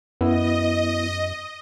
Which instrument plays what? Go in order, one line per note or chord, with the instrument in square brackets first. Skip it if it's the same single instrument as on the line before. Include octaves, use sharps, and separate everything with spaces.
[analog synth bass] F#2 [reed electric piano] B3 E4 [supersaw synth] D#5